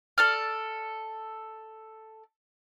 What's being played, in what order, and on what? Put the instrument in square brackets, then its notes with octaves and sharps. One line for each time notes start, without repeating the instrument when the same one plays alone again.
[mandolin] A4 D5 F6